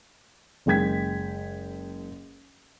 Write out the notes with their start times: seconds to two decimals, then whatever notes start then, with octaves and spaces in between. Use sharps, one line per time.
0.66 F#1 G#3 G5 G#6 B6